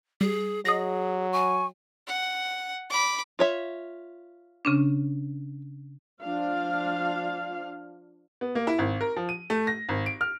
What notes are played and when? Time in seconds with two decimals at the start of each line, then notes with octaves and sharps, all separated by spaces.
0.21 G3 G#4
0.65 F#3 G#4 D#5 A#6
1.33 G#5 C#6
2.07 F#5
2.90 B5 D6
3.39 F4 C#5 E5
4.65 C#3 C#4 D4
6.20 F3 D4 F4 F5
8.41 B3
8.55 A#3
8.67 E4
8.78 G#1
9.01 A#4
9.16 F3
9.29 D#7
9.50 A3
9.67 A#6
9.89 G#1
10.06 D7
10.21 F6